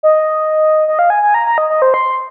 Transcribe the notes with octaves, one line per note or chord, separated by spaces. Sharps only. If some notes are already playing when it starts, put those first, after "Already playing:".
D#5
D#5
F5
G#5
G#5
A#5
A#5
D#5
D#5
C5
C6